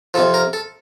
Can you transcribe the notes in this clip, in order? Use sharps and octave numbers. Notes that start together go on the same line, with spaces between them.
F2 C3 F3 A4
A#4
A4